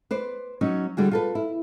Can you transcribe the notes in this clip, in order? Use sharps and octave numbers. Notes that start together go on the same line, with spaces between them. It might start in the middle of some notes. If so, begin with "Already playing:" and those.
B4 C5 D5
F#3 C#4 D#4
D3 G3 F#4 G#4
F4 A4 B4
E4